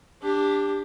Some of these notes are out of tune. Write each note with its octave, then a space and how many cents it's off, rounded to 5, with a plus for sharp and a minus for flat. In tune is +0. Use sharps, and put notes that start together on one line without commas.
D4 +0 G4 +20